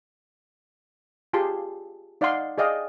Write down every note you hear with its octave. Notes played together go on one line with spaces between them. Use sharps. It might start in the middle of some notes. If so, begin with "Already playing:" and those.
F4 G4 G#4 A5 C6
D#4 D5 D#5 F5 F#5 C6
G#4 D5 D#5 F5 G5